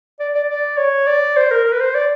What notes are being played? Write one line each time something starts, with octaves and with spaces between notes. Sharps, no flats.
D5
D5
D5
C#5
D5
C5
A#4
A#4
B4
C5
D5